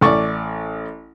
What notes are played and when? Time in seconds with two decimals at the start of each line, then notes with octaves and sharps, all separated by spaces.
0.01 A1 D5 C#6